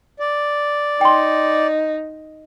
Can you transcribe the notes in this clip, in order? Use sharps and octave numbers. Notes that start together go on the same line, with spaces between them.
D5
D#4 G5 C6